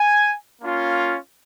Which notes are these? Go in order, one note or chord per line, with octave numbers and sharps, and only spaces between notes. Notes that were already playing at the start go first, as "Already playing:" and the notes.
Already playing: G#5
A#3 C#4 F4